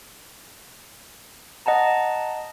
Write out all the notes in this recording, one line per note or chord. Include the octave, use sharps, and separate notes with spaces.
D#5 F#5 A5 A#5